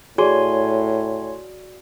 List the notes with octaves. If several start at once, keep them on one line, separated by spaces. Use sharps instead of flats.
A2 F#4 G#4 C#5 D5 G#5 C6